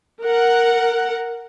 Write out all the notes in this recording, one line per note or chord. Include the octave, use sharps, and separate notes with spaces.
A#4 F#5